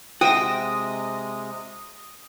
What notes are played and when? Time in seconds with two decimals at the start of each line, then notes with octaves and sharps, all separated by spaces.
0.21 C3 G#3 F#4 C5 E5 G5 D#6 A#6